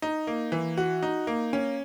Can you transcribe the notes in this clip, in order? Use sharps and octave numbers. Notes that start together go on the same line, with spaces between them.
D#4
A#3
E3
F#4
D#4
A#3
C#4